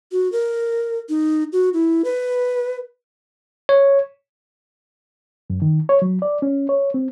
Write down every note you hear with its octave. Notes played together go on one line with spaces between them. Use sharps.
F#4
A#4
D#4
F#4
E4
B4
C#5
F#2
D#3
C#5
F#3
D5
C#4
C#5
C4